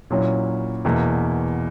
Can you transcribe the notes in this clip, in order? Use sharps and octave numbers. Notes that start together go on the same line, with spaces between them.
A#2 F#3 C#4 E4
E2 B2 A#3 E4